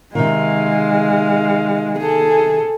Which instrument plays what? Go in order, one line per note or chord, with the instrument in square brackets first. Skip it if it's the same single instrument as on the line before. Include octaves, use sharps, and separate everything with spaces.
[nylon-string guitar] C3 D#3 [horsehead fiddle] G#3 [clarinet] F5
[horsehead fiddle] G#4 A4